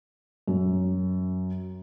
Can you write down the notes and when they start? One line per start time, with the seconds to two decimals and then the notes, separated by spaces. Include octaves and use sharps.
0.47 F#2